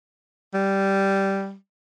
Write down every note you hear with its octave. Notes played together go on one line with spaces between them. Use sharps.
G3